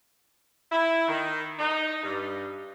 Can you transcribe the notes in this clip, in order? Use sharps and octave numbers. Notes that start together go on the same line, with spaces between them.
E4
D#3
D#4
G2